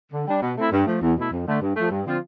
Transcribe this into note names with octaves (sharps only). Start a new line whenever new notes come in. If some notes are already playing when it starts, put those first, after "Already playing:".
D3
G3 D4
B2
A3 C4 E4
G2
F3 A3
E2
B2 A3 E4
F2
D3 A3
G2
F3 A3
G2
D3 F3 C4 F4